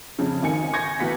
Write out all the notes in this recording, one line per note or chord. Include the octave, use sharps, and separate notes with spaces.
F2 C#3
G#1 D#3 G#5 C#7
G#5 C#6 G6 G#6 A#6 C#7
D2 E3 B3 B6